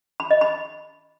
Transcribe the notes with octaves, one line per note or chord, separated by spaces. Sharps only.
B5
D#5
B5